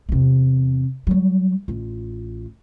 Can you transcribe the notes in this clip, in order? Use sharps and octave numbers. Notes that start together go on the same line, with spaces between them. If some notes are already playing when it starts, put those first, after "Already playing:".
E2 C3
F#3 G3
A1 F4